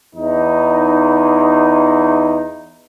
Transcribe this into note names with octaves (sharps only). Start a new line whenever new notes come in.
E2 D#4